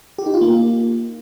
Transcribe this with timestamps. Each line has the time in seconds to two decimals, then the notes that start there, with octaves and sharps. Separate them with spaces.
0.18 G4
0.26 D#4
0.34 F4
0.41 A#3